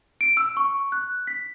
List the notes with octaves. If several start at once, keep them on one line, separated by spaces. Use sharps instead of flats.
D7
E6
C#6
F#6
B6